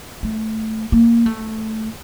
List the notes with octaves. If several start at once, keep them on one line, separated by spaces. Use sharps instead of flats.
A3
A#3
A3